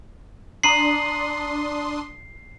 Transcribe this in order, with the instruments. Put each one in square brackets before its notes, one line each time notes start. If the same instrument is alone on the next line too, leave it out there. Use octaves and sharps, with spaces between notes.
[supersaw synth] D4 C6 D#6 [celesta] A#5 D#7 F#7 [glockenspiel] C7